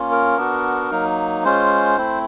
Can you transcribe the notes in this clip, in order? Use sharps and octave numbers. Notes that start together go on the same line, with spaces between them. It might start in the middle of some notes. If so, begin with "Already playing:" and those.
Already playing: A#3 C#4 F4
A#4
B3 D4 F#4
F#3 A#3 D#4
G#3 C#4 F4 C5
A3 C4 E4